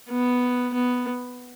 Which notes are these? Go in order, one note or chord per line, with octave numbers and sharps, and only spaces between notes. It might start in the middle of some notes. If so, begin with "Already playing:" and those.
B3
B3